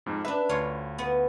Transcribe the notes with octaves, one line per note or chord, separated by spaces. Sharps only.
F2 G#2
D4 B4 E5
D2 F4 C#5 F5
B3